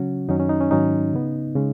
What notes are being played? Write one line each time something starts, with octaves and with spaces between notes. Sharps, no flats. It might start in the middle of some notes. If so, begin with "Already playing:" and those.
Already playing: C#3 F#3 C#4 F#4
F#2 D#3 F#3 C#4 D#4
C#4
D#4
C#4
G#2 D#3 F#3 C#4 D#4
C#3 B3
C#3 G#3 C#4